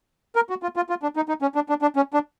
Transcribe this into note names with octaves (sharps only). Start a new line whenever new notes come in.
A#4
F#4
F4
F4
F4
D4
D#4
D#4
C#4
D4
D4
D4
C#4
D4